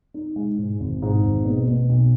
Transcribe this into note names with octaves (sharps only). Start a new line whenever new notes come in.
D#4
G#3
G#2
G#1
G#2
G#1
B2
B2
B1